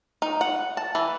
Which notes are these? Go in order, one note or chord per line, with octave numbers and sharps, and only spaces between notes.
D#4
F#5
A5
E3